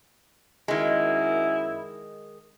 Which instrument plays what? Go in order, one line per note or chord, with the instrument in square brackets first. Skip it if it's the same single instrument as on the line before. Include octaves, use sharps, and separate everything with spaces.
[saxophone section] F#2 E4 [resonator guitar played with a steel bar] D#3 G#3